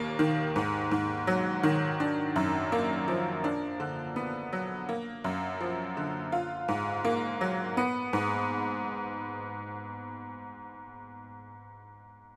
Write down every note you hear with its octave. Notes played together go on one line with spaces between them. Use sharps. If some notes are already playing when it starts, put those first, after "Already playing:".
Already playing: D#2 A#3
D#3
G#2
G#2
F#3
D#3
D4
F#2
A#3
F3
D4
D3
B3
F#3
A#3
F#2
F3
D3
F4
G#2
A#3
F#3
B3
G#2